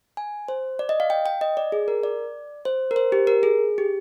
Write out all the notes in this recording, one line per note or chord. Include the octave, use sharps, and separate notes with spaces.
G#5
C5
D5
D#5
F5
G5
G5
D#5
D5
G#4
A#4
D5
C5
A#4
C5
G4
A#4
G#4
G4